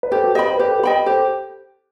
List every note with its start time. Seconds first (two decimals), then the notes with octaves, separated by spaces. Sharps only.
0.03 B4
0.12 G4 A4 C5
0.23 F#4 A4
0.35 G4 B4 D#5 G5 B5
0.48 C5
0.58 G4 B4
0.68 A4
0.79 G4 B4
0.83 D#5 G5 B5
1.06 G4 A4 C5